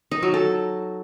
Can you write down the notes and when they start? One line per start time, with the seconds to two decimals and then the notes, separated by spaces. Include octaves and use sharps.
0.11 D#4
0.23 F#3
0.34 A4